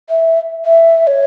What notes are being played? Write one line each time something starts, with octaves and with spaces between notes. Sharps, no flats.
E5
E5
C#5